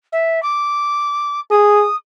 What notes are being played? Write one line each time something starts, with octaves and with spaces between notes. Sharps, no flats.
E5
D6
G#4 D#6